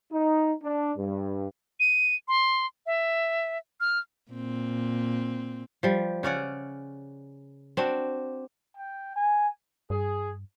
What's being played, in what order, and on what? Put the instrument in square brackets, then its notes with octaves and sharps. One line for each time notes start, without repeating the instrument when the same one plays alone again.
[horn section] D#4
D4
G2
[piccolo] D#7
C6
E5
F6
[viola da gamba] A#2 C4
[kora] F3 G3
C#3 C#4 D5 F#5
C4 D4 F#4
[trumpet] G5
G#5
[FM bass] G2 [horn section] G#4